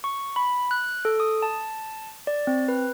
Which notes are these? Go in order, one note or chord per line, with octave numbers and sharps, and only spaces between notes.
C#6
B5
F#6
A4
D#6
A5
D5
C4
B4